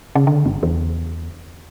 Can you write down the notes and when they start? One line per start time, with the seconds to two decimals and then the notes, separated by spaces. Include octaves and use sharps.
0.15 C#3
0.27 D3
0.46 G1
0.63 E2